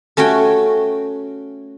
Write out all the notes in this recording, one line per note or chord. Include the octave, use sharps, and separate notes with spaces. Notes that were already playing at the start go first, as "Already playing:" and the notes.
A3 C#4 F#4 C#5 G5